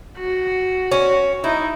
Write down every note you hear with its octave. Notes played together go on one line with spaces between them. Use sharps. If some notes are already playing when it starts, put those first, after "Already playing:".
F#4
C#4
D#4 E4